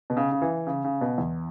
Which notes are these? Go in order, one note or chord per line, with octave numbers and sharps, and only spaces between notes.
B2
C#3
C#3
E3
C#3
C#3
B2
E2